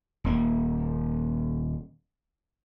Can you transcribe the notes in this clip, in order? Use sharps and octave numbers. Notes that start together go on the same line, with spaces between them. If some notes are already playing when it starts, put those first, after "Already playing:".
D#1 A#3